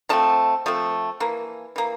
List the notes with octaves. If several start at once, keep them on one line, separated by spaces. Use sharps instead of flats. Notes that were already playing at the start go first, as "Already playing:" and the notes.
F3 A3 C4 A5
F3 A3 C4
E3 A#3
E3 A#3